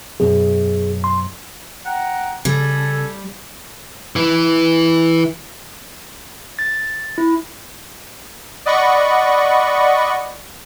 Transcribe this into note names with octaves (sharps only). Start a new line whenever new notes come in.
F#2 B2 G#4
C6
F#5 G5 A#5
C#3 G3 A4 G#5
E3
A6
E4
D5 D#5 F#5 B5 C#6